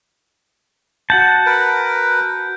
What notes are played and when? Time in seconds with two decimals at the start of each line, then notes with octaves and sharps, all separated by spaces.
1.10 F#4 F#5 A5 G6
1.46 A#4 B4